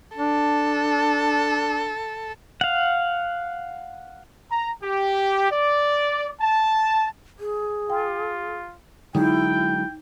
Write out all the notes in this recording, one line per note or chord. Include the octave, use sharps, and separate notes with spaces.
D4 A4
F5 F#5
A#5
G4
D5
A5
G#4
F4 G5
D3 F#3 G#3 D#4 E4 G5